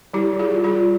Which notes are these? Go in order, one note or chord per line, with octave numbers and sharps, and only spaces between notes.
G3 E4 G4
G3
F4 G#4
G3
F4 G#4
G3